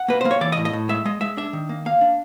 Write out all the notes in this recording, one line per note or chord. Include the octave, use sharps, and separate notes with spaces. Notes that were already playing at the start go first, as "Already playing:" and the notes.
Already playing: F#5
A#3 B4
A#3 C5
C#5
E3 D5
D#5
A2
D#5
A2
G#3 E5
G#3 D#5
G#3 E5
D4 E5
D#3
A#3
A#3 F5
D4